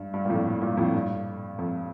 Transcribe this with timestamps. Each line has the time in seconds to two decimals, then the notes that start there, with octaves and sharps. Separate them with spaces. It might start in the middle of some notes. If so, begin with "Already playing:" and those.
Already playing: G2
0.14 G2
0.25 A#2
0.30 F2 A2
0.61 G2 A#2
0.77 F2 A2
0.93 G2
1.58 F2